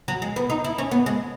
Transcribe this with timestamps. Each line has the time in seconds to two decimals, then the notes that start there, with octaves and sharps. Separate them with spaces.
0.08 F#3
0.22 G#3
0.36 B3
0.50 D#4
0.64 E4
0.78 C#4
0.91 B3
1.06 G#3